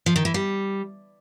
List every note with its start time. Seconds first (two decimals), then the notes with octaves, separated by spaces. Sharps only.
0.06 F3
0.16 D#3
0.25 E3
0.34 G3